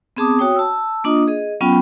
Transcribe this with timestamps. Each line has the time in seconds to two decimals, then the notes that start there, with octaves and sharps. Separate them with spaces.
0.17 B3 C4 G#4 A5 D6 D#6
0.39 F#4 C#5 G5 D#6
0.56 A5 E6
1.04 A#3 D4 F4 D#5 D#6
1.28 G#4 D#5
1.61 F#3 B3 C#4 F4 G5 B5